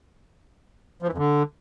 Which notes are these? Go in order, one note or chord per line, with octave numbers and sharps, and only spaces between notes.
F3
E3
F2
D3